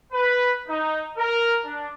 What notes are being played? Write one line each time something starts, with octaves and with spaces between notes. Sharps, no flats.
B4
D#4
A#4
D4